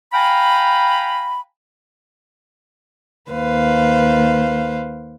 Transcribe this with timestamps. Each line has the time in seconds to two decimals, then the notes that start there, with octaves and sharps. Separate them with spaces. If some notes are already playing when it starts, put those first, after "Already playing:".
0.13 F5 G5 G#5 A#5 B5
3.31 D#2 B4 C5 F5